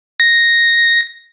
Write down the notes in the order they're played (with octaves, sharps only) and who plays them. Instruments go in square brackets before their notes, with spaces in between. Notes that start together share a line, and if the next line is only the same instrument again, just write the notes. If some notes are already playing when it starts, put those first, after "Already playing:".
[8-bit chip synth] A#6